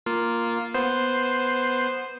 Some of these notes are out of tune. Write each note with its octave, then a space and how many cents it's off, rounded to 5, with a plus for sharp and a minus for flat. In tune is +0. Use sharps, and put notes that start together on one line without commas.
A#3 +0 F4 +0
B3 +0 C5 +0